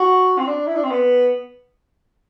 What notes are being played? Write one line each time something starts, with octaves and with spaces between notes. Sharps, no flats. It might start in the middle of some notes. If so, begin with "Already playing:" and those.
Already playing: F#4
C4
D4
E4
D4
C4
B3